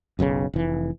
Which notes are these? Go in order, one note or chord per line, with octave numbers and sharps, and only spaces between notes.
F#1 B1 A#2 C#3
F1 E3